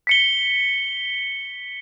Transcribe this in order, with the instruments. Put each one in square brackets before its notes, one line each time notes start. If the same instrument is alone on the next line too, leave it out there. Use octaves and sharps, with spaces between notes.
[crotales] B6 C#7 G7